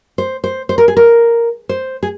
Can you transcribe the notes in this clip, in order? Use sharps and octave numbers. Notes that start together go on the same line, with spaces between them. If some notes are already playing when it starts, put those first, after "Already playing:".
C5
C5
C5
A#4
G#4
A#4
C5
G#4